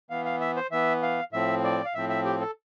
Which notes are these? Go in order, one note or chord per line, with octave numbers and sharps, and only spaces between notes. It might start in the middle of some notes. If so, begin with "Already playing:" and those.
E3 B3 F5
F5
E5
C5
E3 B3 E5
F5
A2 F3 C4 E5
D5
F5
A2 F3 C4 E5
E5
G4
A4